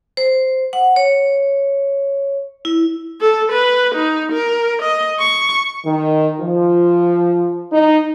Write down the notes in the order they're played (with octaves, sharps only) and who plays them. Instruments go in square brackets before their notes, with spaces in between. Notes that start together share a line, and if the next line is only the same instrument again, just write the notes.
[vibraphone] C5
F#5
C#5
E4
[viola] A4
B4
D#4
A#4
D#5
C#6
[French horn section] D#3
F3
D#4